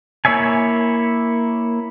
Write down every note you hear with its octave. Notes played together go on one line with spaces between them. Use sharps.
A#3 E4 C#5 E5 G#5